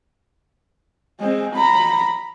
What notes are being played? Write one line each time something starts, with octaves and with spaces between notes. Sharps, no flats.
G#3 C4
A#5 B5